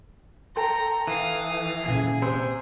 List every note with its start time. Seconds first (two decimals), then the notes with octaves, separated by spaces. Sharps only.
0.56 A4 G5 A#5 C6
1.07 E3 F5 D#6
1.86 A#2 C#3 G#4
2.22 C3 C5 E6